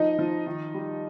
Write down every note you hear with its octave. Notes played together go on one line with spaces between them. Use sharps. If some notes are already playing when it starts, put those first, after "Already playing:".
Already playing: F3 D#4 D#5
F3
D#3
G3